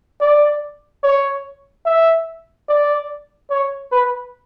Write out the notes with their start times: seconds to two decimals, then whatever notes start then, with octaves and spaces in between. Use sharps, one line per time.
0.21 D5
1.03 C#5
1.86 E5
2.68 D5
3.50 C#5
3.91 B4